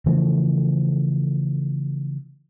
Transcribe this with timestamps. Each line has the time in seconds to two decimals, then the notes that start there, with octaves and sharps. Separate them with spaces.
0.06 C#3 E3 F3 A3